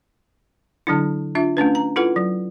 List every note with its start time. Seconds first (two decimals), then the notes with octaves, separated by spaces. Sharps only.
0.87 D3 F#3 D4 E4
1.35 D4 F4 E5
1.57 A3 C#4 D4 B4
1.75 A#5
1.96 E4 F4 A4 B4 F#5
2.16 F#3